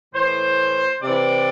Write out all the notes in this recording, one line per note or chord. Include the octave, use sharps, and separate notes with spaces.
A2 E3 C5
C3 E3 D5